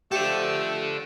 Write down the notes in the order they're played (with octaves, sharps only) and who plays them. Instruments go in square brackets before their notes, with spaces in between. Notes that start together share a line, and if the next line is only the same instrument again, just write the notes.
[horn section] F3 A3 [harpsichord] G4 [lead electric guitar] A4 D5